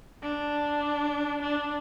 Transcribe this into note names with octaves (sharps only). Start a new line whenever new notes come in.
D4
D4